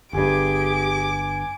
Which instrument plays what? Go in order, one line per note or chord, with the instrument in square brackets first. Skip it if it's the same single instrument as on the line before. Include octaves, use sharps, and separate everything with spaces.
[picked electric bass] G1 G2 [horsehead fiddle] G4 G#4 [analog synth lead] G#5 [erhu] D6